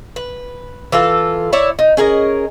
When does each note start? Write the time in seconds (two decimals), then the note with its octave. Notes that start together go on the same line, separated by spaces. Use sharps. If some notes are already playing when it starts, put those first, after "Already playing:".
0.16 B4
0.92 E3 F4 A4
1.53 E4 C#5 D5
1.79 D#4
1.97 C#4 G#4 A#4 D#5